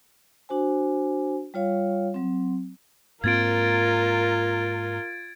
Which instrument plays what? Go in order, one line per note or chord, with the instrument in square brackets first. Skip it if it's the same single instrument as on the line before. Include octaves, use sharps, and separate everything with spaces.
[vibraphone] D4 F#4 C5 G#5
G3 F4 C#5 F5
F#3 C4
[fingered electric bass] G#2 A#3 C4 [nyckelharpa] F4 [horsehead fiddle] A#4 [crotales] G#6 A6 D7